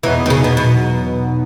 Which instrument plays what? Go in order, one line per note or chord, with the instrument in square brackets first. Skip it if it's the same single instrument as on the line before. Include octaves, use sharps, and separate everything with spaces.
[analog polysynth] E2 B2 F#3 B3 D#4 [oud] E3
[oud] D#3
C#3
B2
B2